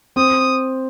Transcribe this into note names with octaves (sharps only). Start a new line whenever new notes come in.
C4 D#6